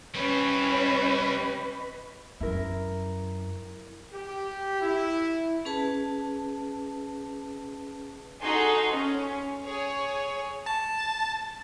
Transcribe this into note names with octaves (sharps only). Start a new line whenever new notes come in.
G3 C4 C#4 B4 D#5 C#6
F#2 E4 A#4
G4
E4
C#4 G#4 B4 A5
D#4 F#4 G#4 A4 C6
C#4
G#4 C#5
A5 A6